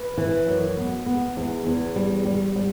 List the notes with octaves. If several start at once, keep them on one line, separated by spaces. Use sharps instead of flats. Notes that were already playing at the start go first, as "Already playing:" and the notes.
Already playing: B4
E3
F#2
B3
B3
E2
E2
G3
G3
G3